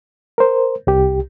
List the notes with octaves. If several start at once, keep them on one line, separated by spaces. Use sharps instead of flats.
A#4 C5
C2 G4